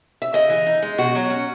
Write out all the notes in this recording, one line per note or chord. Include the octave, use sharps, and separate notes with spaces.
E5
C#3 D#5
E3
D#4
G#3
B2 F#4
F#3
C#4